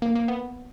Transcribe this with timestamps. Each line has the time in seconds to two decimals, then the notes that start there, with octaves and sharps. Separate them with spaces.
0.02 A#3
0.16 A#3
0.28 B3